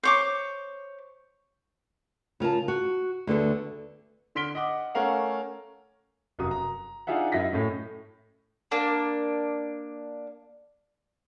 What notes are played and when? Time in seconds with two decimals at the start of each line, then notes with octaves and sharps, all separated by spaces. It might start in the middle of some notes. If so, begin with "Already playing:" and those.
0.03 C5 C#5 D6
2.40 C#3 F4 A#4 A5
2.68 F#4
3.27 D2 D3 B3 A4
4.35 D3 C6 F6 B6 D7 G7
4.55 D#5 F#5 D6
4.95 A3 C#4 A#4 F5 F#5
6.39 F1 F#2 F#4 A#5 D#6
6.51 A#5
7.07 D4 D#4 F4 G#4 E5 F#5
7.32 F#2 E4 D#5 A#6 B6
7.53 A2 A3 C#4
8.71 A#3 D4